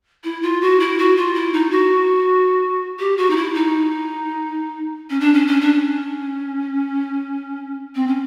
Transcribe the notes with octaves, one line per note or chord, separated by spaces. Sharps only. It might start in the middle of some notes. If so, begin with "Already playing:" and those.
E4
F4
F#4
E4
F#4
F4
E4
D#4
F#4
G4
F#4
D#4
E4
D#4
C#4
D4
C#4
C#4
D4
C#4
C4
C#4